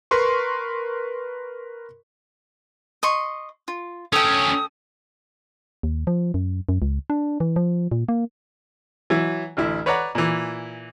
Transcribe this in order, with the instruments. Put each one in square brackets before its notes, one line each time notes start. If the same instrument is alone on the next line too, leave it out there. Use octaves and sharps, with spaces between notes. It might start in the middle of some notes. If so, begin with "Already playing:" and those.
[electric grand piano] A#4 B4 C6 C#6
[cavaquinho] D#5 C6 C#6
F4
[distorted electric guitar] D2 C#4 [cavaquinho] A4 G5 [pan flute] D#6
[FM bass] D#2
F3
F#2
F#2
C#2
D4
E3
F3
A#2
A#3
[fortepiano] E3 F#3 E4
A1 D2 E4
B4 C#5 D5 F#5 A#5
A#2 E3